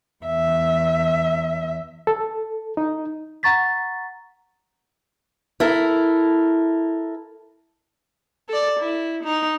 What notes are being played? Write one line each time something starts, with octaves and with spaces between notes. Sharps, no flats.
E2 E5
A4
D#4
F#5 A#5 C#6 A6 B6
E4 A4 A#4
A4 D5
E4
D#4